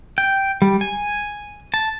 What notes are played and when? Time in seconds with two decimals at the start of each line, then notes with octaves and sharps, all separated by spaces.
0.18 G5
0.62 G3
0.81 G#5
1.74 A5